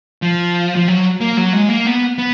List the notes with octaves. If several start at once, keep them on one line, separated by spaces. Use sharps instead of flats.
F3
F3
F#3
A#3
F#3
G#3
A#3
B3
B3